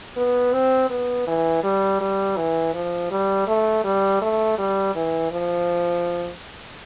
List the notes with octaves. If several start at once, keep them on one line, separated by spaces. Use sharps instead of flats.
B3
C4
B3
E3
G3
G3
E3
F3
G3
A3
G3
A3
G3
E3
F3